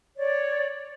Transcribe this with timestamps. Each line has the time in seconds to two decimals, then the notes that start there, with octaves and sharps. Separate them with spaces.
0.17 C#5 D5